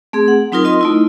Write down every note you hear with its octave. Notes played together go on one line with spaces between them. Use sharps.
A3 C4 G#4
F#5
F#3 C4 D#4 F4 A#4 D#6
F4 D#5 C6
A3 D#4 E4